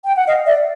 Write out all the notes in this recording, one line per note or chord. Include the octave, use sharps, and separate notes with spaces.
G5
F#5
D#5 F5
D5 E5